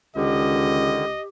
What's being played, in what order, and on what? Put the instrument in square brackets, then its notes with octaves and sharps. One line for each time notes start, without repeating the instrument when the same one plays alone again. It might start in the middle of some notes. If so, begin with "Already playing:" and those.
[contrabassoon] C#2 [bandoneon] D3 D#3 [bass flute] G4 [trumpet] D#5